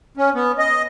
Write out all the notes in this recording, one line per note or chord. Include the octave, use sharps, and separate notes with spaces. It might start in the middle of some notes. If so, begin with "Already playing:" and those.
C#4
B3
D#5